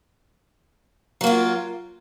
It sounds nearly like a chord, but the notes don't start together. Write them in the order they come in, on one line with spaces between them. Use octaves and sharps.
F#3 A#3 F4